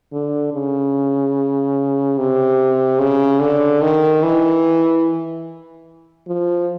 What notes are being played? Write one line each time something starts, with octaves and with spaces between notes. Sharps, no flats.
D3
C#3
C3
C#3
D3
D#3
E3
F3